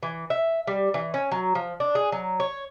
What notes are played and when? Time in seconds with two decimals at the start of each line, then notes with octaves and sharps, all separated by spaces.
0.03 E3
0.30 E5
0.67 G3
0.94 E3
1.14 C#4
1.32 F#3
1.55 F3
1.80 D4
1.95 G#4
2.12 F#3
2.40 C#5